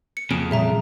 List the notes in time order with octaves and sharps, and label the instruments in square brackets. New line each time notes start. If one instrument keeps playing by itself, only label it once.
[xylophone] C#7
[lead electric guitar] F2 C#3 [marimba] A#3 [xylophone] D7
[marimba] A#2 E3 G3 [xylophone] G#4 E5 A#5